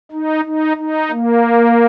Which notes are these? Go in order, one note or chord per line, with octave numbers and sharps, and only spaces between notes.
D#4
D#4
D#4
A#3